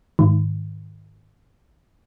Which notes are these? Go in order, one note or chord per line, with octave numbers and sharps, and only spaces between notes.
G#2 D#3